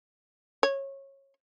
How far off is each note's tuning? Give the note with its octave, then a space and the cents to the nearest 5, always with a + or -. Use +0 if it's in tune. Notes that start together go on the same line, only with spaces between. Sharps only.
C#5 -20